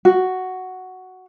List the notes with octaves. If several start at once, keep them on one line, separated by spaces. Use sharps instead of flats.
F#4